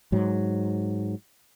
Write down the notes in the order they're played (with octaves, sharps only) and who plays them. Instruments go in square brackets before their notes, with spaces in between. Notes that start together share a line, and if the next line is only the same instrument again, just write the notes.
[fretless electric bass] G#2 F#3